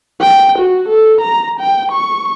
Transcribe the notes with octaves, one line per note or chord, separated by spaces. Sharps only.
G5
F#4
A4
A#5
G5
C#6